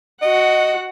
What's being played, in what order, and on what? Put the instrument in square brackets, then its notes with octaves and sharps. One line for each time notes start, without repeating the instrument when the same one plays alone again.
[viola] F#4 F#5 [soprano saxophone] D#5